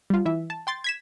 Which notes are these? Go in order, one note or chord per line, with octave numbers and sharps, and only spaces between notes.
G3 F4
E3 E5
A5
G5 C6 A6
G#6 B6 E7